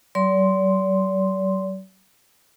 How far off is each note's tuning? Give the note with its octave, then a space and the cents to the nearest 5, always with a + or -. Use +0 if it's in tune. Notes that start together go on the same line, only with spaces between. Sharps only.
F#3 +45 D5 -40 C6 +0